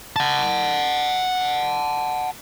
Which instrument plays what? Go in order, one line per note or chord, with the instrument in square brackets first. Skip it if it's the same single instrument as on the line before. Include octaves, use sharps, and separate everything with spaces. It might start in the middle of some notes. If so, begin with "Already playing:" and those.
[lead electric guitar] F#5 A5